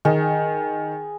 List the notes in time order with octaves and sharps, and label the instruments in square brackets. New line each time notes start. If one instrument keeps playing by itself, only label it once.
[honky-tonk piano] D#3 [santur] G#4